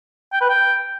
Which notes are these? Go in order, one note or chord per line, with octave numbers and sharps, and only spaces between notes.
G5
B4
G5